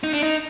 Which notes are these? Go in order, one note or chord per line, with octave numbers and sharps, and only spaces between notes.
D#4
D4
D#4